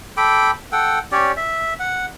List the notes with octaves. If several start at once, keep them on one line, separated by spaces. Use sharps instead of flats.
A4 G5 B5 D6
A4 F#5 G5
C#4 G4 C#5 D5
E5
F#5